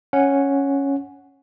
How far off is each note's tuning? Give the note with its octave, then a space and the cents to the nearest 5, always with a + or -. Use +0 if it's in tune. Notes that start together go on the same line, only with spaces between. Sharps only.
C#4 +0 F#5 +0